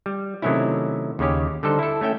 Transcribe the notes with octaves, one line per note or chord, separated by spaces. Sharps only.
G3
C3 D#3 F#3 A3 C#4 E4
D#2 C#3 C#4 G4
D3 G3 D#4 A4 C5
E4 A4
A3 C#4 E5 G5